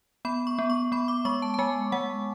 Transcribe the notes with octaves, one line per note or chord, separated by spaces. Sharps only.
B3 B5
C#6
B3
C#6
B3 B5
D6
G#3 C#6
A5
A5
G#3 G#5
G#3 F#5